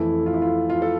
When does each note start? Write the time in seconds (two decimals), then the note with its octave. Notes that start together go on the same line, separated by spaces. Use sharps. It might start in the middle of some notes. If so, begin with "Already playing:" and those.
Already playing: F2 E3 A3 E4
0.26 F4
0.34 E4
0.42 F4
0.70 F4
0.82 A4